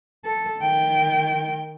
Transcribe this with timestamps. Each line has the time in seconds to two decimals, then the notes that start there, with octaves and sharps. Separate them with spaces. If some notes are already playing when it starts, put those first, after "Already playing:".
0.25 A4
0.60 D#3 G5